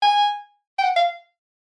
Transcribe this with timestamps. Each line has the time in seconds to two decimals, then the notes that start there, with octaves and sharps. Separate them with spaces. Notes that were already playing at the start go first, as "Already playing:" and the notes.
0.02 G#5
0.79 G5
0.83 F#5
0.96 F5